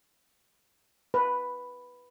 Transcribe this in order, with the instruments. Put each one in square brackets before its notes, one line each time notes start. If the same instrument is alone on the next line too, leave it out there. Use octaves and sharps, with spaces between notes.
[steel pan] B4